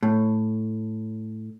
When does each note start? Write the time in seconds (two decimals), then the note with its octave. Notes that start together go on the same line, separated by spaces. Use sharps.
0.03 A2